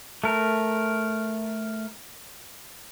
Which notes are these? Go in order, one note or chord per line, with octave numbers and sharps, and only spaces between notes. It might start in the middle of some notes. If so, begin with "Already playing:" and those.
A3 A#4